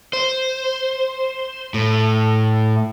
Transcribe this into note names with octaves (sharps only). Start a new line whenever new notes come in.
C5
A2